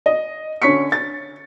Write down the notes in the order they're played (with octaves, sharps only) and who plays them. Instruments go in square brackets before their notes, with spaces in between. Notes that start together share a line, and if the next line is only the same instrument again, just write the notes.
[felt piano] D#5
D3 C#4 C#6 B6 C#7
A6